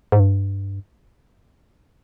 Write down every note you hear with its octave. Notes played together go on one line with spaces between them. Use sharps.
G#2
G2